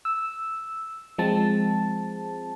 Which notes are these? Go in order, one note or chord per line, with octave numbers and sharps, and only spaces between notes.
E6
F3 G#3 C4 A5